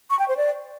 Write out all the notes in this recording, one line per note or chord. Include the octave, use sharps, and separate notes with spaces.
C#6
G5
C5
D5